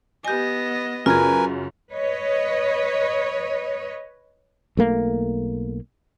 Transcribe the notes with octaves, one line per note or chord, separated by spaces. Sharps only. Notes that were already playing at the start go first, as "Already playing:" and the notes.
B3 G4 D#5 G#5
F#2 C#3 F4 G#4 A#4 B4 G#5
B4 C#5 D#5
B1 A3 A#3